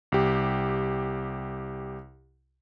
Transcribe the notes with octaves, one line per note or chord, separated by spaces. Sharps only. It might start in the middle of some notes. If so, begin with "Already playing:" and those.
C2 G4